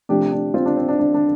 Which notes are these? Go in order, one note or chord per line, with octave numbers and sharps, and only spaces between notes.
C3 F3 A3 D4 G4
D4
C4 F4
D4
C4
D4
D4
D4